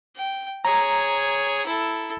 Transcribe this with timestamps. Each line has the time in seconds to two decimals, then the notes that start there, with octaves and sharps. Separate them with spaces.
0.16 G5
0.65 G#4 C#5 A#5
1.66 E4 A4